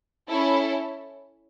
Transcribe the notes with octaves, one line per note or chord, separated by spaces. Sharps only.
C#4 E4 A4